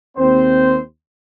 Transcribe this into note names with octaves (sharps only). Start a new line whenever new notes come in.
D#2 C4 C5